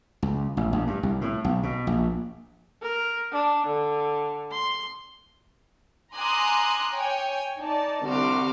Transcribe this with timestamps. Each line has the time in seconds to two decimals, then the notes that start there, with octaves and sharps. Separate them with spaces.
0.22 C#2
0.57 A1
0.73 A#1
0.87 G2
1.03 C2
1.21 A2
1.44 B1
1.63 B2
1.87 A#1
2.82 A#4
3.32 D4
3.67 D3
4.52 C6
6.15 G#5 A#5 C6 D6 D#6 F#6
6.94 C#5 G5 G#5
7.59 D#4 D5 A5
8.06 C2 D3 F#4 C6 D6 F6